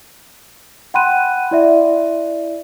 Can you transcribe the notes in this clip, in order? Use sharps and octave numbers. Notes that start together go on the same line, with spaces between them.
F#5 G5 B5 C6 F#6 D#7
E4 D5 E5